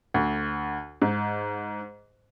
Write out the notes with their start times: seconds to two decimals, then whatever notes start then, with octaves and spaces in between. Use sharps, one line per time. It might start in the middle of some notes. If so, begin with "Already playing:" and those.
0.14 D2
1.02 G#2